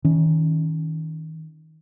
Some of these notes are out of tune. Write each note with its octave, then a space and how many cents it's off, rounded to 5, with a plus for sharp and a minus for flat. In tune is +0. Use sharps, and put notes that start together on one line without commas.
D#3 +30 C#4 +0